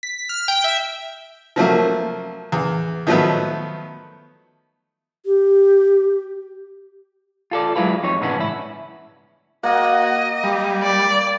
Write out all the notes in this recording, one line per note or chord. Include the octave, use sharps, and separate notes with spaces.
B6
F6
G5
E5
F3 F#3 A3 A#3
E2
D#3 F3 F#3 A3 B3
G4
F4 A4 D5
F#3 G#3 E4 F4 B4
F2 D#4 C#5
A2 C#3 E3 B3 C#4 D4
G#2 E4
A#3 F#4 D#5
G3
D5